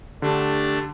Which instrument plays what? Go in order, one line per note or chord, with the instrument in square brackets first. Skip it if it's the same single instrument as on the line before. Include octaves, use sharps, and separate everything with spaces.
[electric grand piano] D3 [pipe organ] A3 D4 [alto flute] G4